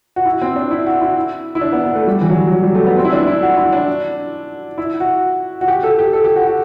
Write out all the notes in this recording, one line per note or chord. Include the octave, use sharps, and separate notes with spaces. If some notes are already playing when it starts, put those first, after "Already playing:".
F#4
E4
C4
D4
E4
F#4
E4
E4
D4
B3
B3
A3
G3
E3
F#3
F#3
G3
A3
B3
C4
E4
D4
E4
F#4
E4
D4
E4
F#4
F#4
G4
A4
G4
A4
G4
F#4
F#4